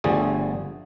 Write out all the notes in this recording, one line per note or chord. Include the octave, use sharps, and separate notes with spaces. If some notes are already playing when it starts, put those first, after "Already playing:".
G1 D3 F3 G3 A3 G#4